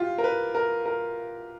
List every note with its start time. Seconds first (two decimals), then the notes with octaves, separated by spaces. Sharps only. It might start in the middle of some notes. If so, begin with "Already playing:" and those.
Already playing: F4 G4
0.18 A#4
0.24 B4
0.55 A#4
0.86 A#4